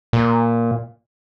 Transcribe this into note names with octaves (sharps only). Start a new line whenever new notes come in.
A#2